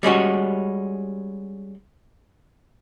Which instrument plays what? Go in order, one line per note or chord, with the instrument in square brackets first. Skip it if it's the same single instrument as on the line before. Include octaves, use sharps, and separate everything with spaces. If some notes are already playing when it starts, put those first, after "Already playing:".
[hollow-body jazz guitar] G3 G#3 C#4 F#4